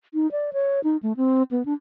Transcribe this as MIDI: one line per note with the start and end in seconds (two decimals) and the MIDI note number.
0.14 0.30 63
0.32 0.50 74
0.53 0.80 73
0.84 0.97 63
1.03 1.13 57
1.17 1.43 60
1.51 1.65 59
1.65 1.73 62